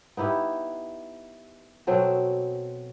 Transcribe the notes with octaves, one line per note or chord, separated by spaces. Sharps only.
B3 D#4 E4 G4
B2 F#3 C4 A4